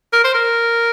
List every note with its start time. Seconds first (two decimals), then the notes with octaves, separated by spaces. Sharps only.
0.13 A#4
0.24 C5
0.34 A#4